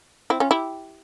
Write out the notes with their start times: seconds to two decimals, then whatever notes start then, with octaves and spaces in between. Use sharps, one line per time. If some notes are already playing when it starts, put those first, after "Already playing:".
0.30 C4 E4
0.40 C#4 F4
0.51 E4 G4